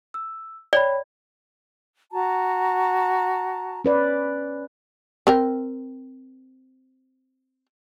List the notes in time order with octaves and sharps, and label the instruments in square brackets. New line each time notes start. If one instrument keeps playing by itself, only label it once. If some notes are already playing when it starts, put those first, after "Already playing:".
[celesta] E6
[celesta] C#5 G5 B5 [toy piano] D5
[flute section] F#4 A5 A#5
[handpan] C#4 B4 D5
[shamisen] C4 A#4 G5